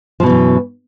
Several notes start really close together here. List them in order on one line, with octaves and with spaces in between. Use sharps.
F3 B2 E3 F#2